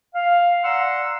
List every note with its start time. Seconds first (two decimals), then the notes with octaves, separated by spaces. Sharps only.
0.14 F5
0.64 D5 F#5 A#5 C6 E6